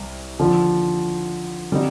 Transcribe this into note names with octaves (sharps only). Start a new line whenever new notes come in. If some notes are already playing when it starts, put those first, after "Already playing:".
Already playing: C2
D#2 D3 F3
D3 G3 C4 D#4